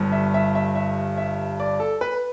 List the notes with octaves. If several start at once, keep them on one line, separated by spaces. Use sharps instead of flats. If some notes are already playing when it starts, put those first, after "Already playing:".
Already playing: G1 G2
E5
E5
E5
E5
E5
D5
A4
B4